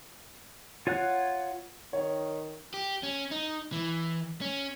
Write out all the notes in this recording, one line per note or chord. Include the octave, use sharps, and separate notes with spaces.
F4 C#5 F#5 F#6
D#3 C#5
G4
C#4
D#4
E3
C#4